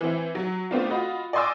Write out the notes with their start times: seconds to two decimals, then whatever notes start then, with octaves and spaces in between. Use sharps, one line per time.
0.01 E3 C4 E4
0.35 F#3
0.71 A3 B3 C4 D4 F4
0.90 F4 F#4 D#5 B5
1.33 D5 D#5 G#5 C6 D6 E6